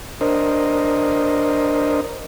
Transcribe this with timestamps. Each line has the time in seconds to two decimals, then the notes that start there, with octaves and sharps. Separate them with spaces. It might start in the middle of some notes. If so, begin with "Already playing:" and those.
0.21 D4 A#4 C5 D#5